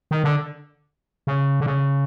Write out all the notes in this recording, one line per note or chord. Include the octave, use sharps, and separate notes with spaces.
D#3
D3
C#3
D3
C#3